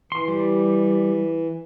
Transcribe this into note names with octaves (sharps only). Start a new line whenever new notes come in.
E3 C6
G3